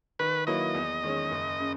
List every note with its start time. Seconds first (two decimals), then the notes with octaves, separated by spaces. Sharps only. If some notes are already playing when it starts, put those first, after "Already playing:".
0.19 D#3 B4
0.47 F#3 A#3 E4 B4 D#5
0.75 E2
1.03 D#3 G#3 C#4
1.31 F#1
1.60 C#3